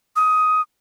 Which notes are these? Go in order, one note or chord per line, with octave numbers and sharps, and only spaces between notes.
D#6